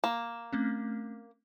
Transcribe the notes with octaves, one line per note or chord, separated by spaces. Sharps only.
A#3 E7
A3 C4 C#4